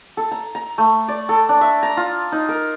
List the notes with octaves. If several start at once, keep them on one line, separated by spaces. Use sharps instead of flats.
A4
A#5
A#5
A3
D5
A4
D4
E5
A#5
F4
D#4
A#4